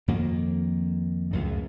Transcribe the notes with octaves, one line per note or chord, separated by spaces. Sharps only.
F2 D#3 A#3
C#2 F#2 A2